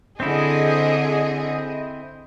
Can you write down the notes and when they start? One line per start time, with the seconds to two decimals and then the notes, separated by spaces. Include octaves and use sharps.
0.20 D3 C4 E4 G#4 D#5